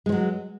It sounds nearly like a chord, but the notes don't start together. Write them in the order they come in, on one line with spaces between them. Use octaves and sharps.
G#3 F3 F#3